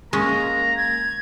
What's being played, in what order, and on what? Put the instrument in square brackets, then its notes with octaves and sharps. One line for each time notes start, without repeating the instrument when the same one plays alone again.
[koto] G#3 C#4 [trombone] A#3 [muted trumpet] A#5
[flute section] G#6